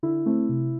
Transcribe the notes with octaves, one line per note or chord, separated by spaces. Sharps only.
D3 E4
A3 C4
C3